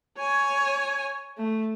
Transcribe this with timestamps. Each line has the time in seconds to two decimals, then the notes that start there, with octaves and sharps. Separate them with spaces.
0.18 C#5 G#5
1.37 A3